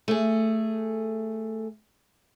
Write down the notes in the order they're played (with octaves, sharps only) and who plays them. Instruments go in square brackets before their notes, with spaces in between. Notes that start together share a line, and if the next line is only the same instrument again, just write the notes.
[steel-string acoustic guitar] A3 G#4